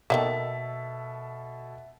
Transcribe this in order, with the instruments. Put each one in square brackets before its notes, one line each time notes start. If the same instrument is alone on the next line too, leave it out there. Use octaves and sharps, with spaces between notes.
[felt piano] B2 A4 [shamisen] D#3 F3 A#3 [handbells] E5